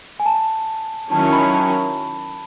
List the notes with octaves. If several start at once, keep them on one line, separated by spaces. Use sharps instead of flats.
G#5
A5
D#3 F#3 C#4 E4 A5
B5
A5